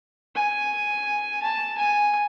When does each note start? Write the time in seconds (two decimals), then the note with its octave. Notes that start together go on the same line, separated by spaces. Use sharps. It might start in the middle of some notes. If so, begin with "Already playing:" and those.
0.36 G#5
1.42 A5
1.78 G#5